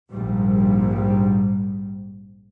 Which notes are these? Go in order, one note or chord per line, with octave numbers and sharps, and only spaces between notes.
A#1 G#2 G3